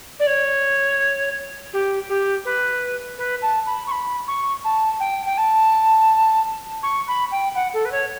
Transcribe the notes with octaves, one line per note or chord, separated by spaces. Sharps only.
D5
C#5
G4
G4
B4
B4
A5
B5
C#6
B5
C#6
A5
G5
G5
A5
C#6
B5
G5
F#5
A4
B4
C#5